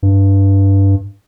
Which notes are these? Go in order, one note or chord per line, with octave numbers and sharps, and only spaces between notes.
G2